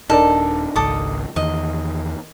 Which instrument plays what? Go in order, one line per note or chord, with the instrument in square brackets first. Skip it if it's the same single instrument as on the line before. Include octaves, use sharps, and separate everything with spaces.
[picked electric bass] D#1 D4 [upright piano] D#4 A#4 D5 [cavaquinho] A4
[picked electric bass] G#1 C#2 [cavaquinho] A4 D6 D#6
[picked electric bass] E2 D#3 [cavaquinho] D#5